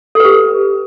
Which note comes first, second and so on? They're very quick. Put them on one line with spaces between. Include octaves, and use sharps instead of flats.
A4 B4 G4